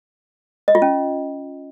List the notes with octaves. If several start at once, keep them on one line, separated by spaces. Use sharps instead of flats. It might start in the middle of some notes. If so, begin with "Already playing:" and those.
D#5
F4
C#4